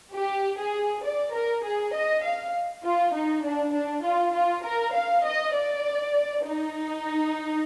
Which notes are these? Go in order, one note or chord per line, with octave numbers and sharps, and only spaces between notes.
G4
G#4
D5
A#4
G#4
D#5
F5
F4
D#4
D4
D4
F4
F4
A#4
F5
D#5
D5
D#4